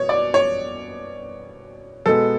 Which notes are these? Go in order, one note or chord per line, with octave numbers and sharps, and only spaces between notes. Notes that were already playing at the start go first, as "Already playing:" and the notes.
Already playing: B2 C#5
D5
C#5
B2 G#3 B3 A4